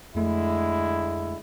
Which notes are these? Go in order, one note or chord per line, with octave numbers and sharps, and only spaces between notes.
F2 D3 G#3 A3 E4 B5